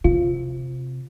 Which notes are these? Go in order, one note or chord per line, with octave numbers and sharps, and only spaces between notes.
C3 F4